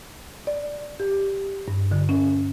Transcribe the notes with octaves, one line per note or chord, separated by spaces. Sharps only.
D5
G4
G2
D3
C#4